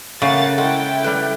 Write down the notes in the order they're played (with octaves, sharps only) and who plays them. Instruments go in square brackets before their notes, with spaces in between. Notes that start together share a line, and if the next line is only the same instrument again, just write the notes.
[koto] C#3 [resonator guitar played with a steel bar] A3 F5 [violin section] A#3 F#5 A6
[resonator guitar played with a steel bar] G#3 A4 F#5 [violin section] E4 G5
[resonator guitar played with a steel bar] G3 A3 B4